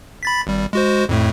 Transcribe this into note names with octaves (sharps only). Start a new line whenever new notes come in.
B5 A6 B6
G#1 G3
G#3 F#4 C5
F2 A2 A3